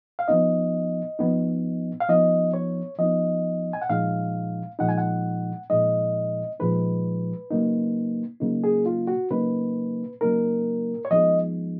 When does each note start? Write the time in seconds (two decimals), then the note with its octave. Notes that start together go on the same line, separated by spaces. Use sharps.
0.19 F5
0.28 F3 B3 D#4 D#5
1.19 F3 B3 D#4
2.00 F5
2.09 F3 B3 D#4 D#5
2.54 C#5
2.98 F3 B3 D#4 D#5
3.73 G#5
3.82 F#5
3.89 A#2 F3 G#3 D#4 F5
4.79 A#2 F3 G#3 D#4 F#5
4.89 G#5
4.98 F#5
5.70 A#2 F3 G#3 D#4 D#5
6.60 A#2 F3 G#3 D#4 B4
7.50 C#3 F#3 A#3 D#4
8.40 C#3 F#3 A#3 D#4
8.64 G#4
8.86 F4
9.08 F#4
9.30 C#3 F#3 A#3 D#4 B4
10.21 C#3 F#3 A#3 D#4 A#4
11.05 C#5
11.11 F3 G#3 B3 D#4 D#5